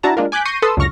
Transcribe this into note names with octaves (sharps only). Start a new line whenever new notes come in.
D4 E4 F#4 A5 A#5
G#3 A#3 D4 F4 A#4
G#5 D6 F#6 G6 B6
C#6 G6 A#6 C7 D#7
A4 B4 A5 C6 D#6 E6
C#2 F#2 D3 C#6 F6 A#6